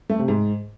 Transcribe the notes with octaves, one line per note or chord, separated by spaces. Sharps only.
A3
C3
G#2